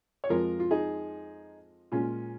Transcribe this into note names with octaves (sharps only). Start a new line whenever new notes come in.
C#5
F2 F3 G#3 F4 A#4
F4
D#4 G#4
A#2 G#3 C#4 F4